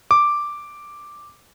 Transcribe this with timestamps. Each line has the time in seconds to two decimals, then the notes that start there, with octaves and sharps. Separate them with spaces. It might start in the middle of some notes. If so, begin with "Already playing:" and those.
0.11 D6